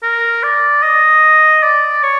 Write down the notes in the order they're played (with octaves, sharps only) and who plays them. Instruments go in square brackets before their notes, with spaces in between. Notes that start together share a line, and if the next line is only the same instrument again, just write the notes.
[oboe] A#4
D5
D#5
D5
C#5